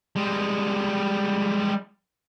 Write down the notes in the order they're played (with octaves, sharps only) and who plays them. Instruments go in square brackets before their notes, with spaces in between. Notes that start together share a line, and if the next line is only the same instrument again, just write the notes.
[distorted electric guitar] G3 G#3